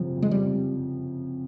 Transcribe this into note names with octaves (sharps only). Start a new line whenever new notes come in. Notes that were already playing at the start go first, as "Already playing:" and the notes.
Already playing: F#1 F2 C3 F3 F#3
F2 G#3
G3
C3